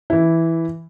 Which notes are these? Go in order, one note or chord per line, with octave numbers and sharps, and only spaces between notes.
E3 E4